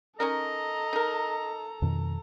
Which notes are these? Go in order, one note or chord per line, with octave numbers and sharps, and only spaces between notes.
C#4 D#4 A4 A#4 D#5 A#5
D#4 A#4
F2 B2 D#3